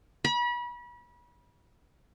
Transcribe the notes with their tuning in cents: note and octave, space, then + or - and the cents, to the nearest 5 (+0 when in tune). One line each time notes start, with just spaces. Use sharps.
B5 -35